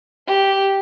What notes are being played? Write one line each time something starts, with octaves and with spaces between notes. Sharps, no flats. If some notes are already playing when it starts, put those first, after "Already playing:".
G4